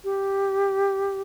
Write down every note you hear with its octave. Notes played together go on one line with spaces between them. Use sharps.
G4